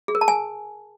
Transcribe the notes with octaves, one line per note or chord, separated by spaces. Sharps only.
G#4
A#4
A5
G#5